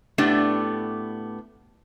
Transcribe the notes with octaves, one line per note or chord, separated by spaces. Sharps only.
A2 A3 B3 D4 G4